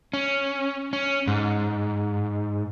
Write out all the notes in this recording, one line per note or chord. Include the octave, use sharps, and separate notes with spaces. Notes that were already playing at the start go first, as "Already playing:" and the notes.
C#4
C#4
G#2